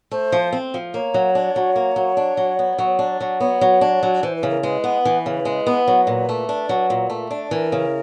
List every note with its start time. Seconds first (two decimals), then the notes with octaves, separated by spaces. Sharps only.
0.11 A3 C5
0.32 F3
0.53 C4
0.74 F3
0.94 A#3 C#5
1.14 F#3
1.35 D4
1.56 F#3
1.76 A#3
1.96 F#3
2.17 D4
2.37 F#3
2.59 B3
2.79 F#3
2.99 D4
3.21 F#3
3.40 B3 C#5
3.61 F#3
3.81 D4
4.03 F#3
4.23 E3 C5
4.35 B4
4.43 C#3
4.49 A#4
4.63 G#3 B4
4.84 B3
5.05 E3
5.26 C#3
5.45 G#3
5.67 B3
5.88 F#3
6.07 A#2
6.29 A3
6.49 D4
6.69 F#3
6.90 A#2
7.10 A3
7.31 D4
7.51 E3 A#4
7.72 C#3